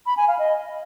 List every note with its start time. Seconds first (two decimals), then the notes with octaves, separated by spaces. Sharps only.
0.06 B5
0.17 G#5
0.28 F5
0.39 D#5